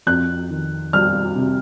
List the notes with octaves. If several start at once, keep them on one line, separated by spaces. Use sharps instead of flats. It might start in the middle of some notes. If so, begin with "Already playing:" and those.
F2 F#6
D#3
G3 F6
C3